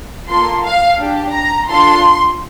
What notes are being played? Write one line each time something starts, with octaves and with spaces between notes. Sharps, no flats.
A#3 F4 A4 C6
F5
D4 G4
A#5
D4 F4 A4 C6